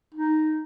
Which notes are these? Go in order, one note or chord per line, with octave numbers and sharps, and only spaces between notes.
D#4